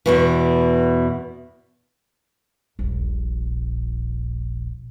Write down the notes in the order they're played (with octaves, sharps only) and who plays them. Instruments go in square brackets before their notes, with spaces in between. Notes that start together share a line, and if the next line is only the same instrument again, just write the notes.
[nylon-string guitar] E2 B2 E3
[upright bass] D#1 A#1